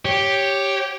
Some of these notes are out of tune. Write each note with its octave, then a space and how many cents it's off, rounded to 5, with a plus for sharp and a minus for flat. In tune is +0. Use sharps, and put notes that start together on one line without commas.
G4 +0 C#5 +0